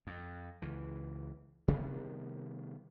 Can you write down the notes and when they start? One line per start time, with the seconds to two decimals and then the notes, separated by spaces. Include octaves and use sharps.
0.07 F2
0.62 C#2 E3
1.68 C3 D#3 G3 B3